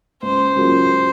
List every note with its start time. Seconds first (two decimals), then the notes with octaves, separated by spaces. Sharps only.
0.22 C#2 C5
0.56 C#3 F#3 A#3 F4